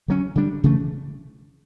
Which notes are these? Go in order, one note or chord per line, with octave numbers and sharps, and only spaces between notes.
D3 F#3 C#4
D3 G3 D4
C#3 E3 A3